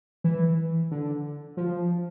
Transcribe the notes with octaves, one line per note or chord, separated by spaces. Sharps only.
E3
D3
F3